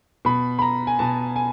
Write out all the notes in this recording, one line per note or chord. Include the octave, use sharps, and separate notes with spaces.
B2 B5
B5
A#5
G#5
B2 A5
G#5